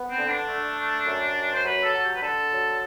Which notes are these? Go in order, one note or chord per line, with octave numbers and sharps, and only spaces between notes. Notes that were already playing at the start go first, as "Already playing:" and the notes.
Already playing: B3
C4
D3
D4
A3
A3
F#2
F#2
C5
F#3 B4
A4
F#3
G4
B4
D3 A4
F#3